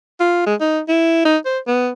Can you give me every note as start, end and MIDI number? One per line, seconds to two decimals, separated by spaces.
0.20 0.42 65
0.46 0.55 56
0.60 0.80 63
0.88 1.24 64
1.25 1.37 63
1.45 1.59 72
1.67 1.90 59